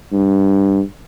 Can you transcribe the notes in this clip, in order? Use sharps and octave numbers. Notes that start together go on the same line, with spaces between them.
G2